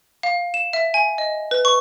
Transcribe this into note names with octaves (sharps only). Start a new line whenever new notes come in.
F5
E7
E5
G#5
D#5
B4
C#6